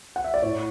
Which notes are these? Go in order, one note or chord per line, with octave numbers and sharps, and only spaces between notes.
F#5
E5
D5
A2 C#5